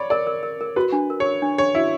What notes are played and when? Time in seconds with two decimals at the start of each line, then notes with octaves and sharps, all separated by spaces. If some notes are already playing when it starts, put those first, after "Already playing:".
Already playing: C#5 D5 B5
0.10 A#4 D5
0.27 A#4
0.43 A#4
0.61 A#4
0.76 F#4 B4
0.92 D4
1.10 A#4
1.20 C#5
1.25 A#4
1.42 D4
1.58 D4 C#5
1.75 E4 F#4